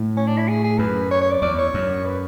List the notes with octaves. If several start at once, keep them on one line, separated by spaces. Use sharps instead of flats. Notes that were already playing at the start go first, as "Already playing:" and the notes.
Already playing: A2
C#4
D4
E4
G#4
G#4
F#2 B4
C#5
C#5
D5
E2 D5
C#5
F#2
B4